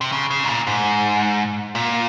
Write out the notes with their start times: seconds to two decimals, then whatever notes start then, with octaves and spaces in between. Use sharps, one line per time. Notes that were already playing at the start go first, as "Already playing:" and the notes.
0.01 C3
0.12 C#3
0.31 C#3
0.44 G#2
0.48 A#2
0.67 G#2
1.75 A#2